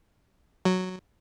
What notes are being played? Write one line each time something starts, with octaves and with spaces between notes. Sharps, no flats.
F#3